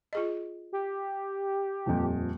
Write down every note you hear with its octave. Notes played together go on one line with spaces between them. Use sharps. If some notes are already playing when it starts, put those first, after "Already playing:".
F4 G#4 D#5
G4
D#1 F2